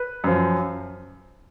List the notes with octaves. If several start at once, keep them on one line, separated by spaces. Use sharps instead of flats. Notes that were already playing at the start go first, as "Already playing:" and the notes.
Already playing: B4
F#2 F3